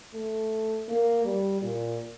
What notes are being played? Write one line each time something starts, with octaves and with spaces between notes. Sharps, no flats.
A3
A#3
G3
A#2